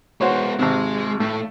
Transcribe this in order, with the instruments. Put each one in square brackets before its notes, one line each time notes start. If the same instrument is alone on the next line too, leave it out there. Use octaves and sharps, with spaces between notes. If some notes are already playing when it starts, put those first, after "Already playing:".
[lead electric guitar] G#3 B3 [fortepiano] F#4 C5 C#5
[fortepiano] G#1 C3 [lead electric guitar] G#3
[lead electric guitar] A2 [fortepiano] A3